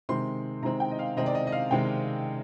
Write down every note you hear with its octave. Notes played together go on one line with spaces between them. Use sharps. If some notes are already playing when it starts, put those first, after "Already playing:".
C3 D#3 G#3 C4 C6
C3 D#3 G#3 C4 A#5
G5
D#5
F5
C3 D#3 G#3 C4 D#5
D5
D#5
D#5
F5
C3 D#3 G#3 C4 G5